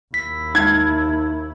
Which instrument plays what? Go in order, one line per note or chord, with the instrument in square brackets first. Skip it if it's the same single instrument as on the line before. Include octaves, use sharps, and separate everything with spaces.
[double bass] D#2 E4 [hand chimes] B6
[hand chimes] D#4 [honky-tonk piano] G#6